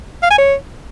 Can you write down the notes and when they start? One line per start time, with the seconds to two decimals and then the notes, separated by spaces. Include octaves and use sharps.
0.23 F5
0.30 G#5
0.38 C#5